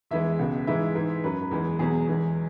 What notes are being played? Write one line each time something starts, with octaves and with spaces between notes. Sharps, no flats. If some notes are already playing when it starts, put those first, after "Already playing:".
E2 E3 G#3 E5
C#2 B2 G#3
G#2 E3 G#3 E5
G#2 E3 G#3
F#2 F#3 B4
E2 E3 G#3
E2 B2 F#3 G#4
E2 E3 G#3